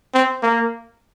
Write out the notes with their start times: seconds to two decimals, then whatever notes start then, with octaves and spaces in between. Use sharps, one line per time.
0.14 C4
0.43 A#3